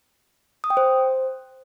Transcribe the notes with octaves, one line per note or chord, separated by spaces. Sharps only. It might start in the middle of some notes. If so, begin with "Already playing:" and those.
D#6
G5
C5